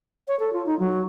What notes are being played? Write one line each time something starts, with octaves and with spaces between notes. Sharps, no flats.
C#5
A4
F4
D#4
F#3